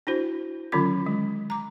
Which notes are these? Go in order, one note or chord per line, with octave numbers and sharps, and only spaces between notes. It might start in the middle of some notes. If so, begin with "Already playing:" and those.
D4 E4 F#4 C5
D3 D#3 F#3 C#4 F4 D6
G#3
A#5 D6